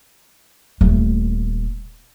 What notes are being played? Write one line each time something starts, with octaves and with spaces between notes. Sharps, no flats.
D#1 A3